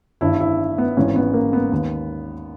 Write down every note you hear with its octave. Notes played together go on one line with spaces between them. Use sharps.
G1 G2 D#3 E4
E4
B3
G#1 G#2 E3 C#4
B3
A#3
B3
D#2 D#3